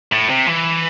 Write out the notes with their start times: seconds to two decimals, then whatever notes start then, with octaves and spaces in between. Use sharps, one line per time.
0.12 A2
0.29 C3
0.47 E3